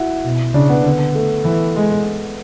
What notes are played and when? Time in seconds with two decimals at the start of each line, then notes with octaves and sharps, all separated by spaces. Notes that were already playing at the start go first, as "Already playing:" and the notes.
Already playing: E4 F#4
0.25 B2
0.54 C#3 D4
0.69 B3
0.84 D3 B3
1.15 A3
1.45 E3
1.76 G#3